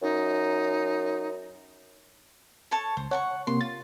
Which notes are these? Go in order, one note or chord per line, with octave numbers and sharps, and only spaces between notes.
F#2 D#4
A4 C#5 A5
C#2 C5
C#5 F#5 A5 C#6
C3 A#3 C6
F4 A6